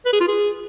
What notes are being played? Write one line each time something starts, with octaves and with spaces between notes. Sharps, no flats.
B4
G#4
F4
G#4